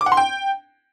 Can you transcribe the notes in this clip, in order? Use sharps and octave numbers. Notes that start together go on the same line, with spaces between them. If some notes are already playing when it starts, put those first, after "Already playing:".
D6
F#5
C6
G5